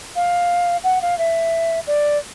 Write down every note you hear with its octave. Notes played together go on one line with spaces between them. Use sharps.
F5
F#5
F5
E5
D5